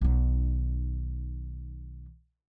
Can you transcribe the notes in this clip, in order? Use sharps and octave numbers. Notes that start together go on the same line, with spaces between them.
B1 D#3